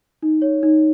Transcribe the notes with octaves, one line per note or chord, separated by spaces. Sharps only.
D#4
C#5
D#4